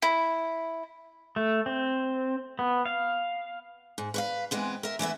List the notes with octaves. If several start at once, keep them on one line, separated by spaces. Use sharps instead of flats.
E4
A3
C4
B3
F5
G#2
B4 C#5 F5
E3 G#3 B3 C4
A#4 E5
E3 A3 B3 E5